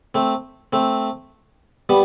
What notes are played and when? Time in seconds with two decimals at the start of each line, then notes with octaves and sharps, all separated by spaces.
0.15 A3 C4
0.73 A3 C4
1.89 G3 B3